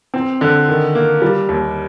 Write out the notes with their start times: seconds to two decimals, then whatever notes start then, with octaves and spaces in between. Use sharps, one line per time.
0.14 C4
0.41 D3
0.68 D#3
0.95 A#3
1.22 G3
1.49 D#2